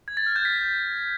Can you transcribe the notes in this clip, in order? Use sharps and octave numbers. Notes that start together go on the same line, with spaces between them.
G#6
A6
F6
G6
B6